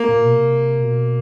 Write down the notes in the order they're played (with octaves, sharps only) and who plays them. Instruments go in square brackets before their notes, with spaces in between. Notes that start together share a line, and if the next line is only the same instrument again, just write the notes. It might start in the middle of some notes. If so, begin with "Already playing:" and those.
Already playing: [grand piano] A#3
[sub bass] A#2
B2
C3
B2